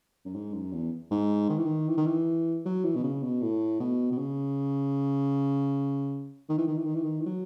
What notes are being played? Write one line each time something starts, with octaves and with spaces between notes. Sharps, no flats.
F#2
G#2
F#2
E2
G#2
D#3
E3
D#3
E3
D#3
E3
F#3
E3
B2
C#3
B2
A2
B2
B2
C#3
D#3
E3
D#3
E3
D#3
E3
D#3
E3
F#3